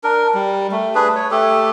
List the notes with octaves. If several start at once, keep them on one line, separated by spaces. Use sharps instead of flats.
D4 A#4
G3
A3
D4 G#4 B4
C#5
A3 G4 A4